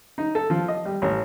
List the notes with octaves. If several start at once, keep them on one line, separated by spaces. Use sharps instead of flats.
D#4
A4
F3
D#5
G3
A1